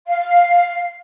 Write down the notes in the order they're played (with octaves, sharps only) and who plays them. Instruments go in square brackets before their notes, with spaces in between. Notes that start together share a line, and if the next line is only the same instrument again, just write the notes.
[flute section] F5